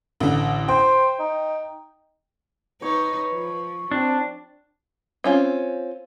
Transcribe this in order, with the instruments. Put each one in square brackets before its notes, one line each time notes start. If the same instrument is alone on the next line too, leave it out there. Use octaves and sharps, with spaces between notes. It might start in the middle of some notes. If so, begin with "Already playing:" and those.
[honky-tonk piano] A1 D3
[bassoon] C5 [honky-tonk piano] G5
[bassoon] D#4
[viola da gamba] D#4 [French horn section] B4 [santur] C#5
[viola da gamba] F3
[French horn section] C4 [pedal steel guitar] D4
[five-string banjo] C4 C#4 F4